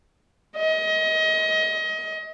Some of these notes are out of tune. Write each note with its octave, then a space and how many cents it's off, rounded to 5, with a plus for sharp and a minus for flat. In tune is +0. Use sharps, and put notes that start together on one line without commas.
D#5 +30